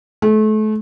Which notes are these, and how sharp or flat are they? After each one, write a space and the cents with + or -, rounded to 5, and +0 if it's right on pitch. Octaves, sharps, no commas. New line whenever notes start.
A3 -35